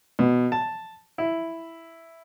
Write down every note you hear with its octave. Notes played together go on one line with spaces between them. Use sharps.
B2
A5
E4